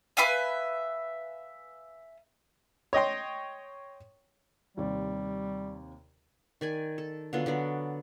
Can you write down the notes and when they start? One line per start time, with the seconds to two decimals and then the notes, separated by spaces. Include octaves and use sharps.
0.17 B4 E5 F5 G#5
2.93 C#5 D#5 G5 C6
4.77 D#2 C3 G3 D5
6.61 D#3 D5 G#5
6.98 A4
7.33 D3 F#3 B3 F4
7.46 D3 F#3 B3 D5